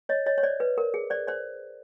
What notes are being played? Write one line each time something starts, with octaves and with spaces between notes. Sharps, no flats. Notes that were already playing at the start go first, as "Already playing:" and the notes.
C#5 D#5
C#5 D#5
C#5
C5 D5
B4
A#4
G#4
C5 D5
C5 D5